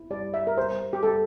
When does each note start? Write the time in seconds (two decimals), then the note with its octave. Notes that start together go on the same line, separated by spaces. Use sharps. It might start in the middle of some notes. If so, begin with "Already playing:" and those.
Already playing: E4
0.10 G3 D5
0.34 E5
0.47 A#4
0.57 G3 C5
0.93 G4
1.03 G3 A4